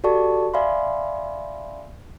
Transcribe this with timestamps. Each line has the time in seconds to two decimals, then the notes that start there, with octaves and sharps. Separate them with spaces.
0.04 F#4 G4 A4 D5 A5 C#6
0.54 D5 E5 F5 G#5 B5 C6